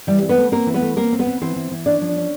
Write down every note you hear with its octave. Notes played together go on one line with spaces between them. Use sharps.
E3 G3 G4
C4
B3 B4
A3
A#3 C4 A#4
E3
B3 B4
A3
A#3 C4 A#4
C4
B3 B4
C4
E3 C4 C5
E3
E3
C#4 D4 D5
F3
C#4